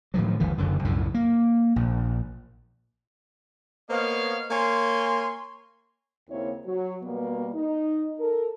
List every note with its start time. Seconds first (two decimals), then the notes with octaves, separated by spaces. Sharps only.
0.14 A2 D#3 F3 F#3
0.40 G1 D2 D#3 E3
0.57 F#1 F#2 D3 D#3
0.84 C2 F#2 A2 C#3
1.14 A#3
1.76 A#1
3.90 A#3 B3 C5 C#5 D#5 F5
4.51 A#3 C#5 G#5 C6
6.30 D#2 C#3 A#3 C4 E4 C#5
6.66 F#3
7.03 B2 G3 A#3 B3
7.54 D#4
8.19 A4 A#4